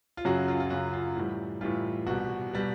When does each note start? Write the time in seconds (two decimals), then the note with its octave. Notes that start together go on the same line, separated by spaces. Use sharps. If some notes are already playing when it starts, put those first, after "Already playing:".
0.17 F4
0.25 F#2 C#3 F#3 F#4
0.48 F4
0.60 F4
0.70 F#2 C#3 F#3 F#4
0.93 F4
1.16 A2 E3 G3
1.61 A2 E3 G3 F4
2.06 C2 B2 G3 F#4
2.53 B2 G3